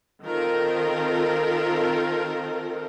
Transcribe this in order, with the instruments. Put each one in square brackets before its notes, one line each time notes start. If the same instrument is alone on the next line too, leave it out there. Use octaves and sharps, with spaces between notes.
[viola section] D#3 C4 F4 A4 A#4